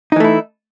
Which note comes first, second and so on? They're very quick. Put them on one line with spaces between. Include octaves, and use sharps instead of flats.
D#4 E3 A3 E4